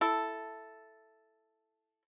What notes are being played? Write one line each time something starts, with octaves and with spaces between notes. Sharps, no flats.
E4 A4